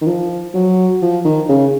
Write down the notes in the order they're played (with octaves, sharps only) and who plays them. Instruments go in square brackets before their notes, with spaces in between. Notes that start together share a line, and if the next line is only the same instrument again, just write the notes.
[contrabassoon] D#3
F3
F#3
F3
D#3
C#3